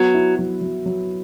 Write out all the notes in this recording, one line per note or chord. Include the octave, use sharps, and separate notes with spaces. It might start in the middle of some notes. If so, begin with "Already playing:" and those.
Already playing: F#3 B3
E4
F#3
F#3
F#3